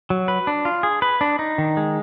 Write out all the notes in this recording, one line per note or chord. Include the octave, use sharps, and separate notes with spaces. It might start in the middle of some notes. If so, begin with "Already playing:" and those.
F#3
B4
D4
F4
G#4
B4
D4
D#4
D#3
G#3